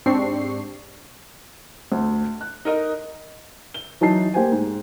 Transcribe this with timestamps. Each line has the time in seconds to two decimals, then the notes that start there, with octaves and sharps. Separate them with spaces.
0.06 G#2 C4 D4 G4 C#6 C7
1.92 D2
2.41 F#6
2.65 D#4 A#4 D#5
3.74 G7
4.01 E3 F#3 D#4 A5 C7
4.34 A#3 G4 C5 G#5
4.52 G#2